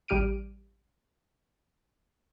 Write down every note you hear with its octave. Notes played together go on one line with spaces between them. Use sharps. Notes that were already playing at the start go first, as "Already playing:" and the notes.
A1 G3 G4 F6 D7 D#7